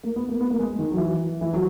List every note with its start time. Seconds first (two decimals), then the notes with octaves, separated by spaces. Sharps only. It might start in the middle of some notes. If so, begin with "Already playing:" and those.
0.03 A#3
0.16 B3
0.29 A#3
0.41 B3
0.50 A#3
0.59 G#3
0.79 D#3
0.92 F#3
0.97 E3
1.41 E3
1.54 F#3